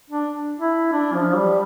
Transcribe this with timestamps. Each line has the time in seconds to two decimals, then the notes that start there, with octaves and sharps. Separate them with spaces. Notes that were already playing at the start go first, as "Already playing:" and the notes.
0.10 D4
0.60 E4
0.92 D4
1.14 F3
1.36 G3